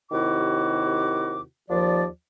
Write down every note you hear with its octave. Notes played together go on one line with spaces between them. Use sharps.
D#2 C3 D#3 E4 F#4 D6
D#2 F3 D5